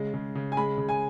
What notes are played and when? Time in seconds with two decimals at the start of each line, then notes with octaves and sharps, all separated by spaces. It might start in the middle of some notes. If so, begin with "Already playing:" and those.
Already playing: C#3 G#3
0.14 C#3
0.35 C#3
0.52 G#5
0.57 G#3 B5
0.78 C#3
0.89 G#5